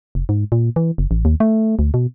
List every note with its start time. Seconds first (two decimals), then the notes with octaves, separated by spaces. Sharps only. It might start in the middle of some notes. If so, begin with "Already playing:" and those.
0.15 F1
0.29 G#2
0.52 A#2
0.76 E3
0.98 F#1
1.11 A1
1.25 D#2
1.40 A3
1.79 D2
1.94 B2